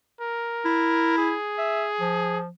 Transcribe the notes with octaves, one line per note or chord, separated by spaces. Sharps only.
A#4
E4
G#4
E5
F3